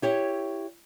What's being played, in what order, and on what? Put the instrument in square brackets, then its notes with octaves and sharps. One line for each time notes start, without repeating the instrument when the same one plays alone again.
[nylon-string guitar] E4 G4 C#5